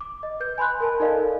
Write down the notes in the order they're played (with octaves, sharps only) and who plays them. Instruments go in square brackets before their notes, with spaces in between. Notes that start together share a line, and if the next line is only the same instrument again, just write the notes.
[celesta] D6
D#5
B4 G6
G#5 B5 C6 F#6
A#4 G#5 A5
D#4 A4 A#4 D5 D#5 F5